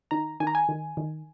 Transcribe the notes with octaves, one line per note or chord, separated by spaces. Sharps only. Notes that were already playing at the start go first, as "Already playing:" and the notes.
D#3 A#5
D#3 G#5
A#5
G#5
D#3
D#3